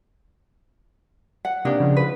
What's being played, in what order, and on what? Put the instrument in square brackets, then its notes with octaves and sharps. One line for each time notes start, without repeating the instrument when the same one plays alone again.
[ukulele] F#5
[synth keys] C3 A#3 G4 [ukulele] D4 D#4
[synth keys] C#3 F3
[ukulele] B4